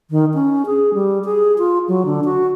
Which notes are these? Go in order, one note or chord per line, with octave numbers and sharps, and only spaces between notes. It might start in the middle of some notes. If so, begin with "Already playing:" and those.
D#3
C#4
G#4
G3
G#4
F4
F#3
D3
F#4